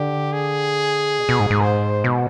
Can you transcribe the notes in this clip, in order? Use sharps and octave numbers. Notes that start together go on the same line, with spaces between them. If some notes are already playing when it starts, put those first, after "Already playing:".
Already playing: D3 G4
G#4
B2
B2
G#2
G#2
C5
B2